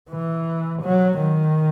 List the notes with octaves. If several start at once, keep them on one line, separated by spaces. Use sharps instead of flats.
E3
F#3
D#3